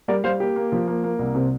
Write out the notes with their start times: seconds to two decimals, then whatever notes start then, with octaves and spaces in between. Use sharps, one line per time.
0.08 G3 A#4 D5
0.24 G3 C5 F5
0.40 A#3 G4
0.56 A#3
0.72 F3
0.87 A#3
1.04 A#3
1.19 C2
1.35 C3